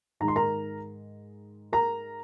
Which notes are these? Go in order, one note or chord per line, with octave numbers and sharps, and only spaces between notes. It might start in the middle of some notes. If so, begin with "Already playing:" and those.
G#2 D#3 G#3 D#4 A#5
C6
A#4 A#5
A#4 A#5